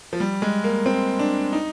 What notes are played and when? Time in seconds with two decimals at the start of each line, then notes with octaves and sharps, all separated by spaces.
0.13 F3
0.20 G3
0.42 G#3
0.64 A#3
0.86 C4
1.19 D4
1.53 D#4